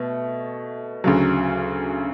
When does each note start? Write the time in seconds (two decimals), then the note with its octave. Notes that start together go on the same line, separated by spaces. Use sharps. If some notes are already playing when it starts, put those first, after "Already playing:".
Already playing: B2 A3
1.04 D2 C#3 F#3